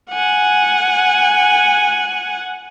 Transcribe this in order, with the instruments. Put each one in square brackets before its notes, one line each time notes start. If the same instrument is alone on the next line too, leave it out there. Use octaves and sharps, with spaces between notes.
[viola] F#5 G#5